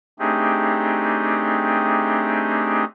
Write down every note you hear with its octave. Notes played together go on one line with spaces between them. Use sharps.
A3 C4 D4 D#4 G4 G#4